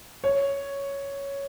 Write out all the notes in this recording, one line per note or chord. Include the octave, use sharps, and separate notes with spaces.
C#5